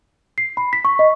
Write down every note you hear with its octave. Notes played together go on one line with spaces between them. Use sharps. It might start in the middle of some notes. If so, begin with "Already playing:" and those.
C7
B5
B6
C#6
D#5